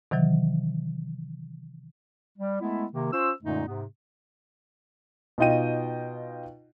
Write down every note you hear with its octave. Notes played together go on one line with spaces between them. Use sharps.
C3 D#3 E3 F#3
G3
G#3 A3 B3 E4
C3 D#3 A#3
C#4 F4 C5 E6
F#2 A#2 D3 G#3 A3 D#4
G#2 C3 B3
B2 D#4 F4 D#5 G5 D#7